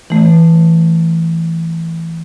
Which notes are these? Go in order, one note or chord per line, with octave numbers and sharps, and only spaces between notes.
E3 A3